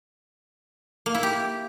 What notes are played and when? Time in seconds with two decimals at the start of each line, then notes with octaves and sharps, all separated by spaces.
1.06 A#3
1.14 E4
1.23 G4